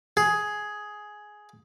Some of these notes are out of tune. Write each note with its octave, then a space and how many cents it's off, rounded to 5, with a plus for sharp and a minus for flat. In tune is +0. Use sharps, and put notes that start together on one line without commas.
G#4 +10